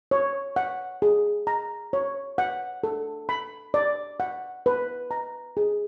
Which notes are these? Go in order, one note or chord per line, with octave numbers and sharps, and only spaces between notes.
C#5
F#5
G#4
A#5
C#5
F#5
A4
B5
D5
F#5
B4
A#5
G#4